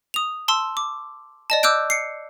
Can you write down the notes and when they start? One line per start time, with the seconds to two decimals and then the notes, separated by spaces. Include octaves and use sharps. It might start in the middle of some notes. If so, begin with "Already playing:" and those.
0.14 D#6 F7
0.48 A5 C6 E6
0.77 D6
1.50 D5 D#5 A5
1.63 D6 E6 F#6 G6 D7
1.90 C7 C#7